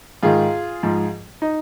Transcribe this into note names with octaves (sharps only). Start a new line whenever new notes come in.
G#2 D#3 F4 G#4
G#2 F3
D#4